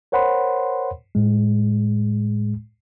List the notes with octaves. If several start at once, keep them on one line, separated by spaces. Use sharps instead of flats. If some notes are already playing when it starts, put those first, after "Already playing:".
A#4 C5 C#5 F#5 B5 C6
A2 G#3